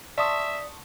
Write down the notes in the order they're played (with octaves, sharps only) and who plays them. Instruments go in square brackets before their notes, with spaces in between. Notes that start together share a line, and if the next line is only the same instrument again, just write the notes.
[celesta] D5 D#6 [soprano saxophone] E5 [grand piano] A5 C6 C#6